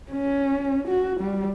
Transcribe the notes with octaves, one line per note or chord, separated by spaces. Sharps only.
C#4
F#4
G3